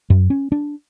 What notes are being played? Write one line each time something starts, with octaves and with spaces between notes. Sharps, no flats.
F#2
C#4
D4